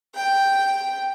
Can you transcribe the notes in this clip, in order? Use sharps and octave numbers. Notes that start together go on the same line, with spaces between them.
G5